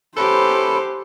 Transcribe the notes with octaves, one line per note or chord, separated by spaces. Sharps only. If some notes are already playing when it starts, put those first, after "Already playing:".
C#4 E4 G4 A4 B4 C5